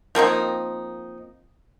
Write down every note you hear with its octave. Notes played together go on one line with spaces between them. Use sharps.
F3 A#3 C4 D#4